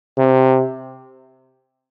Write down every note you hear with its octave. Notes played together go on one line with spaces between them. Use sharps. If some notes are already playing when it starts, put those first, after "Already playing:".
C3